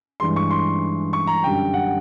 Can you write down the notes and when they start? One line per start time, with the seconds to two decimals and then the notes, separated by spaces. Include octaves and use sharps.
0.20 G2 E3 G#3 C6
0.36 C#6
0.51 C6
1.13 C#6
1.27 A#5
1.44 F#2 D3 G3 G5
1.74 F#5